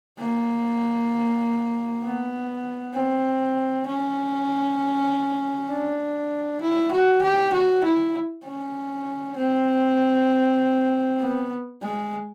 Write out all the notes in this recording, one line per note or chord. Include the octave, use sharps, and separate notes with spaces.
A#3
B3
C4
C#4
D4
E4
F#4
G4
F#4
E4
C#4
C4
B3
G#3